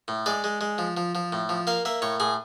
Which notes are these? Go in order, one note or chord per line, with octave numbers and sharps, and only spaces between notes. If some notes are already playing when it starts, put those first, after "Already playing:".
A2
G#3 D5
G#3
G#3
F3
F3
F3
A2
F3
A#3 F5
A#3 E5
A2 C#5
A2 G#4